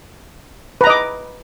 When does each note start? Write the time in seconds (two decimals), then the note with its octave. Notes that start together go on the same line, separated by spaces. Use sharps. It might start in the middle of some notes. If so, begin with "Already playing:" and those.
0.81 B4
0.84 A#5
0.87 D#5
0.90 D6